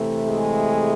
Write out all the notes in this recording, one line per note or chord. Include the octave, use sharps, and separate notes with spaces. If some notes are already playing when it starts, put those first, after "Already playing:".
Already playing: C3 E3 A3
G#3 G#4